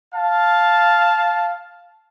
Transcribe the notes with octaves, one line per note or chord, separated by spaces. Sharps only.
F5 A5